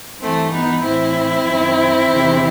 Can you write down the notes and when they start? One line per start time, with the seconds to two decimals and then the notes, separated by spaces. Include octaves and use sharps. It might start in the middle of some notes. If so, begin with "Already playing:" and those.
0.22 G2 E3 A3 C4
0.53 B3 D#4
0.84 A2 E3 C4 E4
1.47 F#2 D#3
2.09 E2 C3 D#3